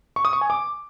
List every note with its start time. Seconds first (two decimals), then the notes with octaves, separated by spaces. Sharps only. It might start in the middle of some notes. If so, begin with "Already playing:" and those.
0.16 C#6
0.25 D#6
0.33 C#6
0.41 G#5
0.50 D6